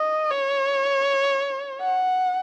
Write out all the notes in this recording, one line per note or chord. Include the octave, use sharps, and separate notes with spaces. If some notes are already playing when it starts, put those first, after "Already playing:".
Already playing: D#5
C#5
F#5